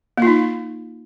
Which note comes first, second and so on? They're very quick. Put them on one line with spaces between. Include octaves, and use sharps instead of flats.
A#3 F4 D#4